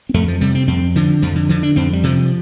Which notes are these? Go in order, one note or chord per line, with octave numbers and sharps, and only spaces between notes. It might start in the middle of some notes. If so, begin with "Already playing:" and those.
C4
F2 A3
F3
C3 G3
C4
F2 C4
D3 F3
F2 F3
D3
D3 F3
D4
F2 C4
G3
C3 F3